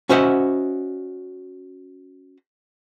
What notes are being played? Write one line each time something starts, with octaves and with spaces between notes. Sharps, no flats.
C#4 F#4 C5 D#5 E5 F#5